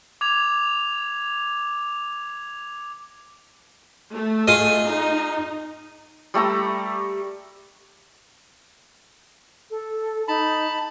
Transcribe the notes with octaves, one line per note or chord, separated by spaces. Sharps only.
D6 G#6 F7
A3
F4 G#4 D#5
D#4
G3 A3 A#5 E6
A4
D#4 A5 B5